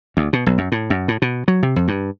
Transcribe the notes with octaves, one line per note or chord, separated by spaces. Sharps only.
D2
B2
B1
F#2
A2
F#2
A2
B2
F#3
C3
F2
G2